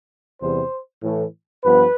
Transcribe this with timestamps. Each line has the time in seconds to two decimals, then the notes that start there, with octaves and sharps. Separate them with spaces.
0.40 E2 C3 E3 G3 C5
1.02 A2 E3 A3
1.63 G2 F3 B3 B4